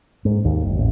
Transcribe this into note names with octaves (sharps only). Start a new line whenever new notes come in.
G#2
D#2
F#1
A1